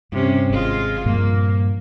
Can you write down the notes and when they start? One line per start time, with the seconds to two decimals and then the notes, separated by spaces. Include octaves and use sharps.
0.12 G2 C3 C#4
0.50 G#1 G#3 F4
1.05 G2 A#2 F3 A#3